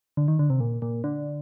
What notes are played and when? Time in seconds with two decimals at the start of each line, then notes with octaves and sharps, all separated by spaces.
0.17 D3
0.28 D#3
0.39 D3
0.50 C3
0.60 A#2
0.82 A#2
1.04 D3